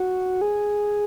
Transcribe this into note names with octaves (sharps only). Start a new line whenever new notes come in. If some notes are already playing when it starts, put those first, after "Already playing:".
Already playing: F#4
G#4